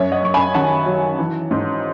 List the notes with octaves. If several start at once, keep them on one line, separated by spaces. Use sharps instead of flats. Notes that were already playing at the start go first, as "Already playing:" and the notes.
Already playing: F#2 F#3 C#5 E5
D#5 F#5
F#2 C#6
G#5 B5
D#3 F#5 A5
F#3
E3
G#2